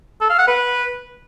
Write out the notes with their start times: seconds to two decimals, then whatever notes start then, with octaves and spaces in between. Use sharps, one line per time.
0.21 A4
0.30 F5
0.39 F#5
0.47 B4